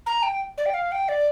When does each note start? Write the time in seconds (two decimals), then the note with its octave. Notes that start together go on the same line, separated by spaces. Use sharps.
0.06 A#5
0.22 G5
0.57 D5
0.65 G5
0.74 F5
0.91 G5
1.08 D5